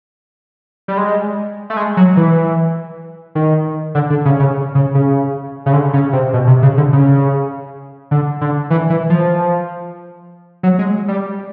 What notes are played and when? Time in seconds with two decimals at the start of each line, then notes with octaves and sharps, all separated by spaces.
0.88 G3
0.98 G#3
1.70 A3
1.77 G#3
1.97 F#3
2.17 E3
3.35 D#3
3.95 D3
4.10 D3
4.25 C#3
4.40 C#3
4.75 C#3
4.95 C#3
5.66 C#3
5.73 D3
5.93 C#3
6.13 C3
6.33 B2
6.47 C3
6.62 C#3
6.77 D3
6.93 C#3
8.11 D3
8.41 D3
8.70 E3
8.90 E3
9.10 F3
10.63 F#3
10.79 G#3
11.08 G3